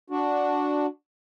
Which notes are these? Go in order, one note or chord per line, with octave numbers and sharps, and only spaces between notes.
D4 F#4